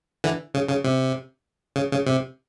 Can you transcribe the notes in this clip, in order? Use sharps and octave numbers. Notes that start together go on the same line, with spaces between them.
D3 E3
C#3
C#3
C3
C#3
C#3
C3